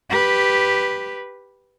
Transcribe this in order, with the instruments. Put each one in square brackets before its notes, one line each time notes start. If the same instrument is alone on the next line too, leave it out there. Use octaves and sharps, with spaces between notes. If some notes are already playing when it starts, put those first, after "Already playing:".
[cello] G4 B4